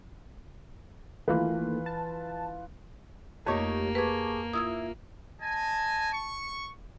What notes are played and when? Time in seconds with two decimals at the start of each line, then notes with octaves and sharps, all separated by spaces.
1.28 D#3 E3 A3 A#3 F4 B4
1.86 A5
3.47 F2 A3 A#3 D#4 G4 C#5
3.95 G#4 B4 G5 A5 C#6 D6
4.53 E4 F4 D#6 E6 G#6
5.41 D#5 G#5 A5
6.13 C#6